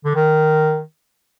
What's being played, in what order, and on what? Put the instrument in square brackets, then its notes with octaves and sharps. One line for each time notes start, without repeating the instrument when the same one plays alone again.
[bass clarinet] D3
D#3